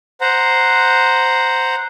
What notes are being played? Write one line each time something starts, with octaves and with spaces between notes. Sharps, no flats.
C5 F#5 A#5